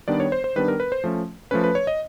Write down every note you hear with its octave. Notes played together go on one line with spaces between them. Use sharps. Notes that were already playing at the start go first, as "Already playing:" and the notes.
D#3 G3 B3 D4 D5
C#5
C5
C5
D#3 G3 B3 D4 B4
A#4
B4
C5
F3 A3 C#4
F3 A3 C#4 B4
B4
C#5
D#5